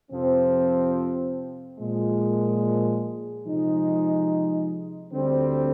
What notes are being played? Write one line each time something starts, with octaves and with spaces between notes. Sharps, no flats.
F2 C3 F3 C4
A#2 F3 G#3
C3 F3 G#3 D#4
D2 D3 G3 C4